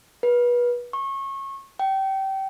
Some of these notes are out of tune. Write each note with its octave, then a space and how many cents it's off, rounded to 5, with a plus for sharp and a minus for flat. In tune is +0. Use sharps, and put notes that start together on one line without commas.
B4 -30
C#6 -25
G5 -25